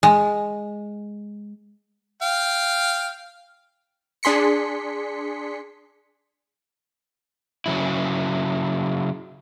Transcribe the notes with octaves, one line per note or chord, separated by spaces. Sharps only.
G#3
F5 G5
D4 G#4 C6 B6 C#7
C#3 F#3 E4